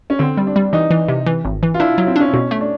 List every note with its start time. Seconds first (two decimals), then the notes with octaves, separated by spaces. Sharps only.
0.10 C#4
0.19 D3 C4
0.37 G3
0.47 D4
0.56 G3
0.73 E3 D#4
0.90 E3
1.08 C3
1.26 E3
1.45 G#1
1.63 E3
1.74 F4
1.80 D4 E4
1.94 F4
1.98 F#3
2.07 C4
2.16 C#4 D4
2.34 B2 C#4
2.51 A3
2.61 D4